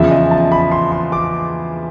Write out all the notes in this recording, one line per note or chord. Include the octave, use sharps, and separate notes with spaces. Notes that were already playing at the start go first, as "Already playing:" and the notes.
Already playing: E2 C#3 F3 E5
D#5
A5
B5
C6
C6
D6